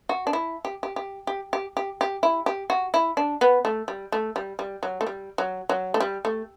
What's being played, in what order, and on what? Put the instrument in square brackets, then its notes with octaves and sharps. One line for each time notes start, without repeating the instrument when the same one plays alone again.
[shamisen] F#4
D4
E4
G4
G4
G4
G4
G4
G4
G4
E4
G4
F#4
E4
D4
B3
A3
G3
A3
G3
G3
F#3
A3
G3
F#3
F#3
A3
G3
A3